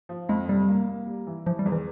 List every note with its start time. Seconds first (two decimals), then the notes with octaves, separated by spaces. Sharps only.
0.09 F3
0.29 F2 G#3
0.49 C3 G3
0.69 A#3
0.88 A#3
1.07 G3
1.27 E3
1.46 E3 F3
1.59 G3
1.66 E2
1.72 E3